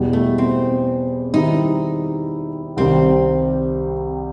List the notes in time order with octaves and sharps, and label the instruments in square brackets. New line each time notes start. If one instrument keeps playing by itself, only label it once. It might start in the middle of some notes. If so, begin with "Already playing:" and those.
Already playing: [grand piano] E2 B2 G3
[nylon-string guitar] A3
C4
[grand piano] D#3 G3 C4 E4 [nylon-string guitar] D#4
[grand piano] C2 C3 D#3 G3 [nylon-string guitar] C4